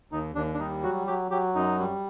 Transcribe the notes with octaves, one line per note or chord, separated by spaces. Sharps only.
D#2 D#4
D#2 D4
D4
G3 D#4
F#3 F#4
F#3 G4
F#3 G4
F#2 D#4
G3